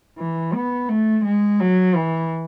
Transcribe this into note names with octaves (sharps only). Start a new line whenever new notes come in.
E3
B3
A3
G#3
F#3
E3